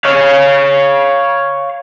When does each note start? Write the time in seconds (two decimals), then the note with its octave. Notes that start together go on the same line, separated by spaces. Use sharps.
0.05 C#5 F5